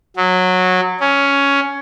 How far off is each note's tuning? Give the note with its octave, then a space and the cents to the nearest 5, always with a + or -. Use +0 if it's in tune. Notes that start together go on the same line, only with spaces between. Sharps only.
F#3 -15
C#4 +10